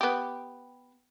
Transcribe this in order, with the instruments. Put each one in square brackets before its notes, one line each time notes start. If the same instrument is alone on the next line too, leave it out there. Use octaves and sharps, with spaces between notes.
[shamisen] B3 G4